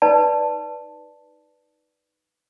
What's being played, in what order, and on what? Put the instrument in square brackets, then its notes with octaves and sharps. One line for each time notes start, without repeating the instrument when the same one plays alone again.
[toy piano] D#4 B4 D5 A5